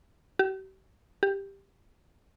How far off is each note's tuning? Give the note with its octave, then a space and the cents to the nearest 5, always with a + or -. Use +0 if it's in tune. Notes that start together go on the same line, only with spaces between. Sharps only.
G4 -40
G4 +10